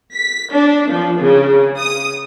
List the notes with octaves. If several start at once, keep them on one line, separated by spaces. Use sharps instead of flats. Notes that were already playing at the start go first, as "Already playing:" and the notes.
B6
D4
F3
C#3
D#6